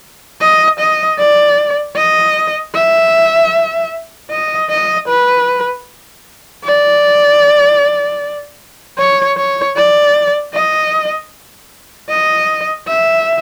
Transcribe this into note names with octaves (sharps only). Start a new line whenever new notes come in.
D#5
D#5
D5
D#5
E5
D#5
D#5
B4
D5
C#5
C#5
D5
D#5
D#5
E5